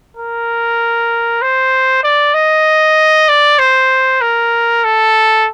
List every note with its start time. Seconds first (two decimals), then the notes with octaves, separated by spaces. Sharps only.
0.17 A#4
1.42 C5
2.03 D5
2.34 D#5
3.29 D5
3.59 C5
4.21 A#4
4.84 A4